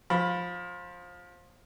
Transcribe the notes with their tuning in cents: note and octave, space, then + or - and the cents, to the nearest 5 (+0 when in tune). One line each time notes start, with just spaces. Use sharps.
F3 +20 B5 +0